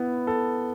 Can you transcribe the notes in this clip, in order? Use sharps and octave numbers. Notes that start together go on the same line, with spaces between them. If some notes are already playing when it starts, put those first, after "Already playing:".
Already playing: B3 E4
A4